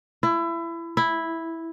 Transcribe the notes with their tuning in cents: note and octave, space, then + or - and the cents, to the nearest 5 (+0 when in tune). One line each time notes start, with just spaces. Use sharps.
E4 +25
E4 -5